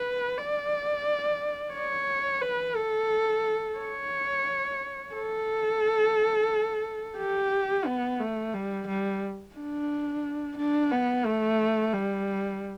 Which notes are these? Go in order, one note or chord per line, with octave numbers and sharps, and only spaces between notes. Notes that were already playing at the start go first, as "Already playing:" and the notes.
Already playing: B4
D5
C#5
B4
A4
C#5
A4
G4
B3
A3
G3
G3
D4
D4
B3
A3
G3